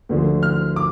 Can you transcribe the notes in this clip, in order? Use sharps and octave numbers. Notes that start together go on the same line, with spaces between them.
D2 D3 F3
F6
D6